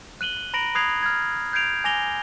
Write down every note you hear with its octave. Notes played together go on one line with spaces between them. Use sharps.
F#6 D#7 F#7 G7
A#5 B5 A#6 D7 F#7
B5 D#6 F#6 G#6 C7 F7
F6 G#6
G6 G#6 C7 D7 F7
G#5 D6 A#6 F7 G7